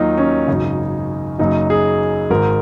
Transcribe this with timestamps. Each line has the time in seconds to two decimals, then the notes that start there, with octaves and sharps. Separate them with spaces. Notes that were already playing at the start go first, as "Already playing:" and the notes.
Already playing: D#2 D#3 F#3 D#4 F4
0.18 C#4
0.48 G#1 F#2 C#3 D#4
1.39 F#1 F#2 C#3 F#3 D#4
1.70 G#4
2.30 G#1 G#2 D#3 A#4